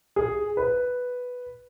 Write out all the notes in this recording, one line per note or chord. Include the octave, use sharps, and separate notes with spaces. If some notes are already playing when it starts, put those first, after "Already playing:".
G#4
B4